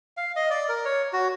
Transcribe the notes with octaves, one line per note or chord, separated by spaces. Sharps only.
F5
D#5
D5
A#4
C#5
F#4